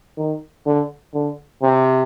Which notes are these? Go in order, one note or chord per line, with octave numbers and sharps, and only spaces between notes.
D#3
D3
D3
C3